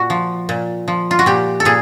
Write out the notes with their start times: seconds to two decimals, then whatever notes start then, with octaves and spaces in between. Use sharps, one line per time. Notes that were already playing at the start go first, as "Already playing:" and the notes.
Already playing: A#2 F#4
0.10 F3
0.49 A#2
0.88 F3
1.11 F4
1.19 F#4
1.26 A#2 G4
1.60 A4
1.65 A#2 G#4